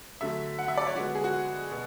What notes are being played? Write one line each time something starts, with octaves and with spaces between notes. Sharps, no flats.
D3 F#3 A3 E5
F#5
E5
D5
C#5
D3 G#3 B3 F#4
G#4
F#4
B2